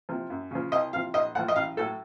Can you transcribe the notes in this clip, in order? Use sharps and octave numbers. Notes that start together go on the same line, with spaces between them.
C3 F3
F#2
C#3 F3
C2 D#5
C3 F3 F5
A#1 D#5
A2 F3 F#5
D#5
A1 F5
A2 F#3 A4